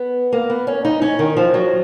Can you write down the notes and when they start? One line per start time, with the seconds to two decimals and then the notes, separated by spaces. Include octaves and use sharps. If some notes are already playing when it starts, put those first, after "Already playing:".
Already playing: B3
0.32 A#3
0.50 B3
0.67 C#4
0.85 D#4
1.02 C#4
1.19 D#3
1.37 F3
1.54 F#3